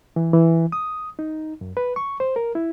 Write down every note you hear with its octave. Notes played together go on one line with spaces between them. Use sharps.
E3
E3
D#6
D#4
F#2
B4
C#6
C5
A#4
E4